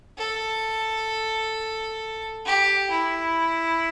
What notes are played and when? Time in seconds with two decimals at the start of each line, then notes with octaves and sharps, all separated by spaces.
0.18 A4
2.46 G4
2.91 E4